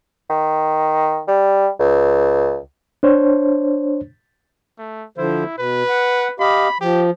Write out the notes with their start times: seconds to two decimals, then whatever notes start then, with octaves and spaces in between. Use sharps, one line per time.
0.30 D#3
1.28 G3
1.80 C#2
3.03 D4 C5 C#5
4.79 A3
5.18 D3 F3 E4 C5
5.58 B2 B4
5.89 F#5
6.40 G4 D#5 F5 B5
6.81 F3 G4